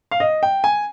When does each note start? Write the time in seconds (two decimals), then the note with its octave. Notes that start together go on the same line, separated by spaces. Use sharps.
0.11 F5
0.20 D#5
0.43 G5
0.64 G#5